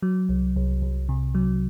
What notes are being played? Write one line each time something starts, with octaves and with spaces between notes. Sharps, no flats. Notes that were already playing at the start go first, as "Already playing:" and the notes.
F#3
C2
C2
C2
C3
F#3